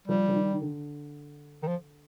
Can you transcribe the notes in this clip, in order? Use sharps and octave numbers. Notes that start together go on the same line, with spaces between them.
F3 G3
F3
D#3
D#3
D3
D#3
F3